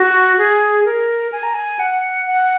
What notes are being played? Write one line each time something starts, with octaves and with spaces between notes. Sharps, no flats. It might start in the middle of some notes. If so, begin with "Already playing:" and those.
Already playing: F#4
G#4
A#4
G#5
A#5
G#5
F#5
F#5